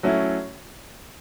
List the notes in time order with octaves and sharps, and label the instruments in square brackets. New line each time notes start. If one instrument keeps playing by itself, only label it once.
[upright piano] F#3 A3 C#4 E4